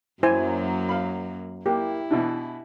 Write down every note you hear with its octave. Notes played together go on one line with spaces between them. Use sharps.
F#2 F#3 A#3 E4 C5 G#5
F5 B5
A#3 E4 G4
B2 E3 D4